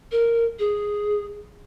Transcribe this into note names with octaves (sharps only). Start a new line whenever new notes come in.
A#4
G#4